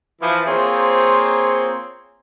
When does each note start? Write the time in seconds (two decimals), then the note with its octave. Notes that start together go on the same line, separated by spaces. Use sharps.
0.21 E3 F3
0.46 A#3 C4 F4 G#4 C5 C#5